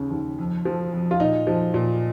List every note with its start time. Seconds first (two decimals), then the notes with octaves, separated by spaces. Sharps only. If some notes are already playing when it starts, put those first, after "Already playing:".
Already playing: D#2 C#3
0.11 D#2
0.39 F2
0.65 F3
0.93 F2
1.11 F4
1.20 A#2 D#4
1.47 F3
1.74 A#2